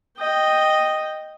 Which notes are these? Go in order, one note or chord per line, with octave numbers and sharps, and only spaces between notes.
D#5 G5